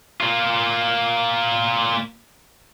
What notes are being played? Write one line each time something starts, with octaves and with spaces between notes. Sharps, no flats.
A#3 F4